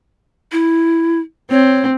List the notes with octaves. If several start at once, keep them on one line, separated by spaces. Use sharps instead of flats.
E4
C4 C#5